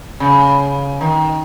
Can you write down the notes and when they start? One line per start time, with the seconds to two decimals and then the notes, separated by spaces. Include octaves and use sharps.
0.20 C#3
1.01 D#3